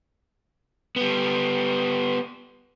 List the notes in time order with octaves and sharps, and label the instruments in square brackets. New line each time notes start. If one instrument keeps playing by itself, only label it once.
[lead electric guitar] G3 B3